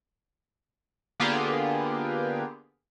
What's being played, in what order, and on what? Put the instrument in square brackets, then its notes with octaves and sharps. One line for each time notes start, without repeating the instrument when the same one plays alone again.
[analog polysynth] D3 A#3 B3 F4 G4 G#4